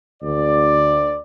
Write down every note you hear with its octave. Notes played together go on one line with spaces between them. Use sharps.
D2 D5